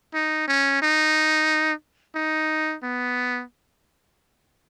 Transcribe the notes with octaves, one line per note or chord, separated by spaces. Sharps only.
D#4
C#4
D#4
D#4
B3